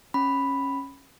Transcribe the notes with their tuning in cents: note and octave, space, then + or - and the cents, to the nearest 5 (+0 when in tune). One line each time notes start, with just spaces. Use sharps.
C#4 -15 B5 +0